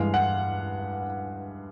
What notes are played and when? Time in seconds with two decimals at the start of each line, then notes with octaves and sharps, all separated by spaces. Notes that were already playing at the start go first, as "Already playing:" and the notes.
Already playing: G2 E3 G#3 F5
0.14 F#5